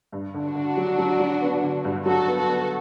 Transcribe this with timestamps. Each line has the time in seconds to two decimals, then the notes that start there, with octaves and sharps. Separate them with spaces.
0.12 G2
0.34 D3
0.44 D4 F#4
0.55 D3
0.77 F#3
0.98 F#3
1.20 F#3
1.42 B3
1.63 D3
1.85 G2
2.06 F#3 F#4 A4
2.28 B3
2.38 F#4 A4
2.49 B3